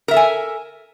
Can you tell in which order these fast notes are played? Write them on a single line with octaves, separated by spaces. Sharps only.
A#4 E5 A4 G#5